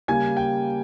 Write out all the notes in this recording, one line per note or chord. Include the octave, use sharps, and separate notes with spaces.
C#3 G3 A#3 G#5 G#6
G5